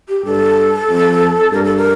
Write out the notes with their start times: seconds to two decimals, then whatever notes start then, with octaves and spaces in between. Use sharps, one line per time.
0.09 G4
0.25 G2 A4
0.89 F2
1.52 G2 A#4
1.64 A4
1.76 A#4